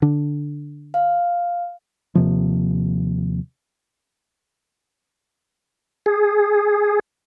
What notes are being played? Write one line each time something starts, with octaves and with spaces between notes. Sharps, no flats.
D3 D4
F5
D#2 C3 F3
G#4